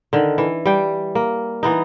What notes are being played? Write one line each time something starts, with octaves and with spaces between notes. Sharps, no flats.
D3 D#3
E3
G3 G5
A#3
E3 B3 D#4